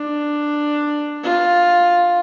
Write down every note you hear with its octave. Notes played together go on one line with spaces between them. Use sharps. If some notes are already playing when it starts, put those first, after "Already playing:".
Already playing: D4
F4